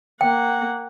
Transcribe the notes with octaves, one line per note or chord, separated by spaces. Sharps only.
A#3 F#5 G5